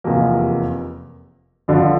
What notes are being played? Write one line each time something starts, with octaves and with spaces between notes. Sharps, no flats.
F1 E2 C3 F3 A#3
G1 F2 D3 F3